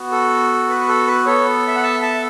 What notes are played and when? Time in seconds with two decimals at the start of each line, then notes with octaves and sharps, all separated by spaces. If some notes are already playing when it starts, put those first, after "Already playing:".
Already playing: B3 F#4
0.12 A4
0.69 B4
0.88 A4
1.07 B4
1.26 B3 A4 C#5
1.68 E5
1.76 F#5
1.83 E5 A5
2.02 E5 A5